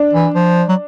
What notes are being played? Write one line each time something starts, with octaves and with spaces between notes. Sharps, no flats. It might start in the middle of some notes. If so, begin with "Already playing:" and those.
Already playing: D4
E3
F3
F#3